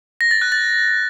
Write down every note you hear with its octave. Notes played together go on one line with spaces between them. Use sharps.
A#6
A6
F#6
A6